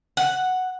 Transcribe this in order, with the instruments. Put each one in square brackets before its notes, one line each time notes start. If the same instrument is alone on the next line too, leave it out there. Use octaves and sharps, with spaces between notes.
[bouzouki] F#5